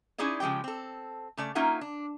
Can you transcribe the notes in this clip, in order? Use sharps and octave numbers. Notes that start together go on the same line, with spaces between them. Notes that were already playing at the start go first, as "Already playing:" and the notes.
C#4 D#4 E4 G#4 D5 D#5
C#3 F3 G#3 G4 G5
C4 A4
C#3 A3 D5
A#3 C#4 D#4 F4 E5 F#5
D4